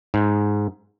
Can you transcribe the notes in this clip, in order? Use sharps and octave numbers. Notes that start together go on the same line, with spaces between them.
G#2